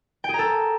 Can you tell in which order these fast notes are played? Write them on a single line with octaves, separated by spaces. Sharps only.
G5 G#4 A#5 A4